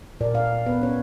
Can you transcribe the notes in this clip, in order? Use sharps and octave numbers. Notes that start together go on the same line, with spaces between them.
A#2 A#4 D5
D5 F5
B3 B4
C#4 C#5